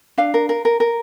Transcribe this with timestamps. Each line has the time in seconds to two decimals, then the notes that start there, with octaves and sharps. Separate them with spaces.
0.18 D4 F5
0.34 A#4
0.49 A#4
0.65 A#4
0.80 A#4